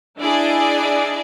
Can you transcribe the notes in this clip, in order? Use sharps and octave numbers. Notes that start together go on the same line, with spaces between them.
D4 E4 G#4 D5 D#5